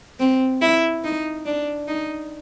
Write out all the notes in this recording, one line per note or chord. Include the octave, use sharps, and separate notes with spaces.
C4
E4
D#4
D4
D#4